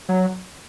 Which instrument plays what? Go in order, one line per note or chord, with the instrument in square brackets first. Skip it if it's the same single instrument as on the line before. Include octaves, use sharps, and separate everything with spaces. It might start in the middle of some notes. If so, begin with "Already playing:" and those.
[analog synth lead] F#3